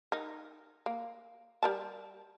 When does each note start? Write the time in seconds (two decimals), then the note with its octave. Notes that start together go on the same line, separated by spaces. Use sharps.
0.12 D#4 A#4
0.86 A#3
1.63 G3 A#4 A5